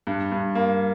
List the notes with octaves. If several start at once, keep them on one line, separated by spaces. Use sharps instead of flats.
G2
G2
A#3